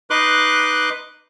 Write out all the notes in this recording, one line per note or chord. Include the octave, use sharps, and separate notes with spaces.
D#4 B4 C6 D6 F#6